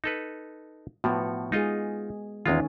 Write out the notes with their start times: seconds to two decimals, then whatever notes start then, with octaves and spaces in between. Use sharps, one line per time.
0.04 D#4 A4 B4
1.04 A2 F3 B3 F#4
1.52 G#3 D#4 F4 G#4 D#5
2.46 E2 D#3 G#3 C#4 F4